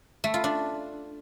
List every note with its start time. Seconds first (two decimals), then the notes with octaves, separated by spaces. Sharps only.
0.24 A3
0.34 F4
0.44 D4